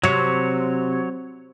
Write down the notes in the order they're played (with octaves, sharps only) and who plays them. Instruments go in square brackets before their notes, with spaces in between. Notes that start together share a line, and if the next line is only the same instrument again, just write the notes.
[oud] C3 [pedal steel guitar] F#3 C#5